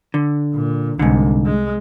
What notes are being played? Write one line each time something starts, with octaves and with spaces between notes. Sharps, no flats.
D3
A#2
C2 G#2 D3
G#3